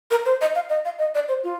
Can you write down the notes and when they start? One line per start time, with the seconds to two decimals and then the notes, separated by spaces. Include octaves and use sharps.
0.11 A#4
0.26 C5
0.41 D#5
0.55 F5
0.69 D#5
0.85 F5
0.99 D#5
1.15 D5
1.29 C5
1.44 F4